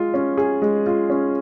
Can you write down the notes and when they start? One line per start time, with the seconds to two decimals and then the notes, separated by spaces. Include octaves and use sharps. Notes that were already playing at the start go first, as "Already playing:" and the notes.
Already playing: G#3 F4
0.14 C#4
0.37 G#4
0.62 G#3
0.87 F4
1.10 C#4